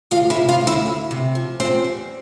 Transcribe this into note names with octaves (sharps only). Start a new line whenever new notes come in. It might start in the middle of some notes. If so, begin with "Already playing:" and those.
D2 F4 F5
E4 E5
C3
F4 F5
D2
E4 E5
D2
C3
F3
E2 C4 C5
G3